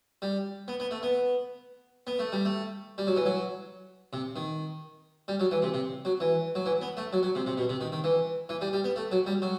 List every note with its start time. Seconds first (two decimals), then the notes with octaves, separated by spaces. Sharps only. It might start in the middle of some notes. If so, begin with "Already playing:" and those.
0.22 G3
0.68 B3
0.80 B3
0.91 A3
1.03 B3
2.07 B3
2.19 A3
2.32 G3
2.45 A3
2.98 G3
3.07 F#3
3.17 E3
3.26 F#3
4.13 C3
4.36 D#3
5.28 G3
5.40 F#3
5.51 E3
5.62 C3
5.74 C3
6.05 F#3
6.20 E3
6.55 F#3
6.66 E3
6.81 B3
6.97 A3
7.13 F#3
7.23 F#3
7.35 C3
7.46 C3
7.58 B2
7.69 C3
7.81 D#3
7.92 D#3
8.04 E3
8.49 E3
8.61 G3
8.73 G3
8.84 B3
8.96 A3
9.12 F#3
9.26 G3
9.42 F#3